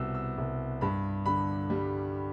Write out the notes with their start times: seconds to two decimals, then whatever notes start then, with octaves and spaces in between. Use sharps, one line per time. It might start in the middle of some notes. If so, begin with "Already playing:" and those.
Already playing: C2 B2 B3 E6
0.15 E6
0.38 C2
0.81 G2 B5
1.26 D3 B5
1.70 G3